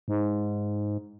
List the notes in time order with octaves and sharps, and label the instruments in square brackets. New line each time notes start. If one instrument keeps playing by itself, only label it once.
[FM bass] G#2